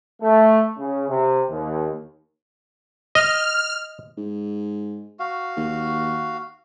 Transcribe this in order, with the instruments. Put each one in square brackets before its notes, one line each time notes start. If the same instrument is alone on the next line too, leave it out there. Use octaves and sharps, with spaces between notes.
[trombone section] A3
C#3
C3
D#2
[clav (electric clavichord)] D#5 [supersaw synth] F6
[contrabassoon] G#2
[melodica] F#4 F5
[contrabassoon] D#2